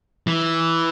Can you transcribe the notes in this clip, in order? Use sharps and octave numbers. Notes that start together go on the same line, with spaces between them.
E3